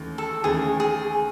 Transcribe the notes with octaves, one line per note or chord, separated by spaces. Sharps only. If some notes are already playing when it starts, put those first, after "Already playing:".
Already playing: D#2 C#3 E3 A3
A4
D#2 C#3 E3 A3 G#4
G#4